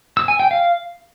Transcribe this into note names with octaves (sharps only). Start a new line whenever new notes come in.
E6
G#5
G5
F5